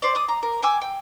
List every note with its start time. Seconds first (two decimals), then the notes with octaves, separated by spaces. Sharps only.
0.02 C5 D5
0.15 D5 D#6
0.28 A#5
0.43 A#4
0.62 G5 G#5 D6 E6
0.82 G5